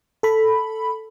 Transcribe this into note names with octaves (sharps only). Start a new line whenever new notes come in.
A4 B5